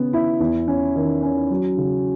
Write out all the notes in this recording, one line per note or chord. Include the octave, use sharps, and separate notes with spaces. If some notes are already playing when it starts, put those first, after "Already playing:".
Already playing: C#3 B3
E4
E2
C#4
D#3
C#4
F#3
C#3